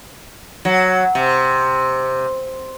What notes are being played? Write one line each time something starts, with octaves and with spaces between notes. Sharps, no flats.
F#3
C3